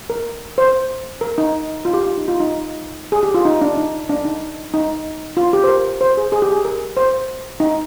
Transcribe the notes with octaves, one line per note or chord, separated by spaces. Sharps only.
A#4
C5
A#4
D#4
F4
G4
F4
D#4
F4
D#4
G#4
G4
F4
D#4
D4
D#4
D4
D#4
D#4
F4
G4
C5
A#4
C5
G#4
G#4
G4
G#4
A#4
C5
D#4